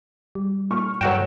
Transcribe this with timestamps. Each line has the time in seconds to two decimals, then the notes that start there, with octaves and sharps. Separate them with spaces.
0.35 G3
0.70 A#2 C#6 F6
1.01 G2 F#3 F#4 C#5 G5 E7